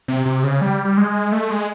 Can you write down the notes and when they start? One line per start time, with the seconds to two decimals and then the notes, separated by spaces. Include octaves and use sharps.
0.08 C3
0.26 C3
0.44 C#3
0.61 G3
0.85 G3
0.97 G#3
1.32 A3
1.51 G#3